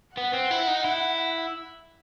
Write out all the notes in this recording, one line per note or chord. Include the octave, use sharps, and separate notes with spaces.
B3 F#5
C4
E4
D#4
E4